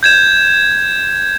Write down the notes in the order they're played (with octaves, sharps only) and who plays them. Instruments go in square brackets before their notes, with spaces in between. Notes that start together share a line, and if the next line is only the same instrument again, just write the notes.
[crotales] G6 G#6 E7